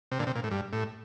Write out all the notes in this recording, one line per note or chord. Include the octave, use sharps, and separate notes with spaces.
C3
A#2 D3
C3
A#2
A2
G2
A2